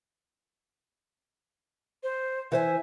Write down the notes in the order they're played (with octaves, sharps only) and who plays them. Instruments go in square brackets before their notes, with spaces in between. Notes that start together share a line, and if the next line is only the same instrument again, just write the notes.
[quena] C5
[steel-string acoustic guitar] E3 C5 G#5 [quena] E5